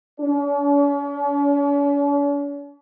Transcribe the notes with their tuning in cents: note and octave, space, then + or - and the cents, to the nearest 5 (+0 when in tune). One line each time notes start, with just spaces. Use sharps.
C#4 +45